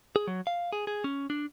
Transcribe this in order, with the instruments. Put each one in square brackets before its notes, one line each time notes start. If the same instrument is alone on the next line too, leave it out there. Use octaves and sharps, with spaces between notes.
[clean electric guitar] G#4
F#3
F5
G#4
G#4
C#4
D4